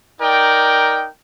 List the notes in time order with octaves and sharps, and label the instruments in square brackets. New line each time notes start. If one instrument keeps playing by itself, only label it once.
[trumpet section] D#4 A#4 D5 G5